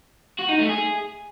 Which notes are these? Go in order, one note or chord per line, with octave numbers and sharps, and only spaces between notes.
F#4
D#4
A3
G#4